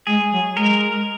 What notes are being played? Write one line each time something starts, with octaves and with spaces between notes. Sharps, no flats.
G#3 G#4
F#3
G#3 A#4